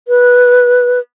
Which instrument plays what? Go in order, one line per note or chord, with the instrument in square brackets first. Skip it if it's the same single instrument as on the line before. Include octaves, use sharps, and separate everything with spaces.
[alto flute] B4